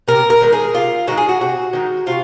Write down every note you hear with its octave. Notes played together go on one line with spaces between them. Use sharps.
C3 A#4
A#4
D#3 G#3 D#4
G#4
C3 F4
D#3 G#3 D#4 F#4
G#4
F#4
C3 F#4
D#3 G#3 D#4
C3 F4